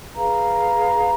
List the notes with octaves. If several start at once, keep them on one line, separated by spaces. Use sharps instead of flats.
G#4 B4 F5 A#5